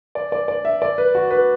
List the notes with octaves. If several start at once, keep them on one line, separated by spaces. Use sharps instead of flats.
D5
D5
D5
E5
D5
B4
F#4
B4